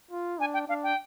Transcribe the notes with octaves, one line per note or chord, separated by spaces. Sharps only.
F4
D4 G#5
G5
D4 F5
G5